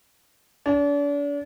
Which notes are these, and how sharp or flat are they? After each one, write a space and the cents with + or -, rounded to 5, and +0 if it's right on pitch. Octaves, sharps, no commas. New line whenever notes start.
D4 -40